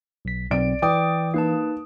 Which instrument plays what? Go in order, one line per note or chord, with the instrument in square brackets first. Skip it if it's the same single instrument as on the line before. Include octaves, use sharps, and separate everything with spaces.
[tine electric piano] B1 B6
[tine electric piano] B1 C4 [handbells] D5 [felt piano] D7
[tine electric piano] E3 [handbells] D5 G5 D6 [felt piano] D#6
[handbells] A#3 B4 A5 [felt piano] D#4